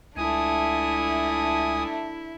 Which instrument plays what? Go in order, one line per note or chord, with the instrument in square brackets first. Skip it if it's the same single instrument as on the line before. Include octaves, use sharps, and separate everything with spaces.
[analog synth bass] C#2 [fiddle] A3 D4 [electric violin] E4 [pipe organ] G#5 D#6